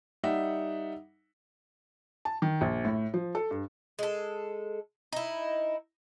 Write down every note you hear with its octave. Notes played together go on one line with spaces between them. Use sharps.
G3 D#4 E5 F#5
A5
D#3
A#1
A2
F3
A4
G2
G#3 A4
D#4 E4